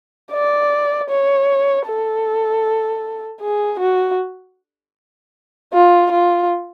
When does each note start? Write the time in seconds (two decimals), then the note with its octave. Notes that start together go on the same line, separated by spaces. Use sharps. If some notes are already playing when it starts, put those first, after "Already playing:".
0.32 D5
1.09 C#5
1.86 A4
3.41 G#4
3.79 F#4
5.73 F4
6.11 F4